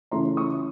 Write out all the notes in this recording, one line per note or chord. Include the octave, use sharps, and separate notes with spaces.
C#3 E3 A3 C#4 A#5 C6
C#6 D#6